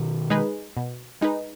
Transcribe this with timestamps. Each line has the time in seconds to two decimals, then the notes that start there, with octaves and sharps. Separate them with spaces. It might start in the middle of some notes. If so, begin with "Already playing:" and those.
Already playing: B2 D#3
0.30 G#3 D#4 G#4 B4
0.77 B2
1.21 G#3 D#4 G#4 B4